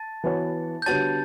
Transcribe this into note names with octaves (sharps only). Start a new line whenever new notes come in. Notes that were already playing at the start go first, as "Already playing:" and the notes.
Already playing: A5 A6
E3 B3 F#4 C#5
G6
D3 G3 B3 F#4 C#5 A5 A6